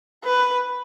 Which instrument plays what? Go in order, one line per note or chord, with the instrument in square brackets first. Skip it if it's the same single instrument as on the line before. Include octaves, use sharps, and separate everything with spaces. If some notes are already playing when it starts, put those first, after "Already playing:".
[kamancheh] B4